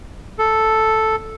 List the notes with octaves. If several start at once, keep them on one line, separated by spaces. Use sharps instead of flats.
A4